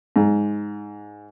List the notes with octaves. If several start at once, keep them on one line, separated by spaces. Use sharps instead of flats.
G#2